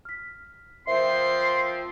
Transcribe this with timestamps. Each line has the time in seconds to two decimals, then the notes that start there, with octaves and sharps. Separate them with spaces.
0.05 F6 B6
0.87 F3 C4 A#4 C5 E5 C6